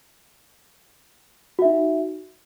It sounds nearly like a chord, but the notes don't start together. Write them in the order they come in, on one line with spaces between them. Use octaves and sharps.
F#4 E5 D#4